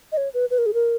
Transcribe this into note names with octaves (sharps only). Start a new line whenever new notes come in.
D#5
C#5
B4
B4
A#4
G#4
A#4